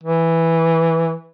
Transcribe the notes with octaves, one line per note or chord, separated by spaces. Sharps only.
E3